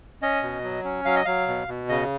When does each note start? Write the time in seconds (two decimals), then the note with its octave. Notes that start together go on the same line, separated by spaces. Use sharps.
0.22 C#4 D#5
0.43 B2
0.64 F#3
0.84 C#4
1.05 F#3 F5
1.16 D#5
1.25 F#3 F5
1.47 B2
1.68 B2
1.89 C#3 D#5